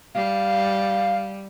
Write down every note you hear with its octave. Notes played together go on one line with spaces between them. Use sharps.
G3 F5